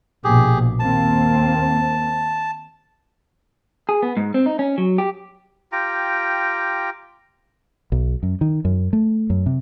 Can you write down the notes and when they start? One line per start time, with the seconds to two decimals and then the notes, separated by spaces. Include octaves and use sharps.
0.24 A#1 B2 G4 G#4
0.79 D#2 A#3 C4 A5
3.89 G#4
4.03 B3
4.17 G#2
4.34 C4
4.46 D#4
4.59 C#4
4.78 F#3
4.98 G4
5.72 F4 G4 G5 A#5
7.92 B1
8.23 F#2
8.41 D#3
8.65 F#2
8.93 A3
9.30 F#2
9.46 C3